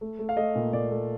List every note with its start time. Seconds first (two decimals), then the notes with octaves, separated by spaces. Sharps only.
0.01 A3
0.19 A3
0.29 F5
0.37 A3 D#5
0.55 A#2
0.73 A#2 D5
0.91 A3